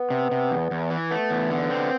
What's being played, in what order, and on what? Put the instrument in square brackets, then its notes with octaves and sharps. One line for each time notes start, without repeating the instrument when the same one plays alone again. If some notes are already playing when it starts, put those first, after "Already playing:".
Already playing: [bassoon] B3
[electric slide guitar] C3
C3
E2
E2
E3
[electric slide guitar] A3 [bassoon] B3
[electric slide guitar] E2
D3
C4